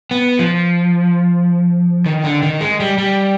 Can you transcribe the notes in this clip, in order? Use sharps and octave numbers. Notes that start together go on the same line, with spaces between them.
B3
F3
D#3
D3
D#3
G#3
G3
G3